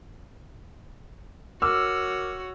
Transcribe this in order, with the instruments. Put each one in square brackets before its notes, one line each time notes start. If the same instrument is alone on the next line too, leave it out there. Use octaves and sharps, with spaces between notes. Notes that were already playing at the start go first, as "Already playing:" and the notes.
[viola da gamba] F#4 C#5 [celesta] A#4 D6 F6 [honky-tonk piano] E6